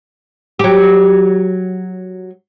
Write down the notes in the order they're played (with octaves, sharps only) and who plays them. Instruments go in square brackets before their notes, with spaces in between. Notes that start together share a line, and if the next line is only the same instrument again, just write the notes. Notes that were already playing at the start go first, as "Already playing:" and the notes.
[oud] F#3 G4